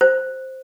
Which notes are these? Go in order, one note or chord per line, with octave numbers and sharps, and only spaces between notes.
C5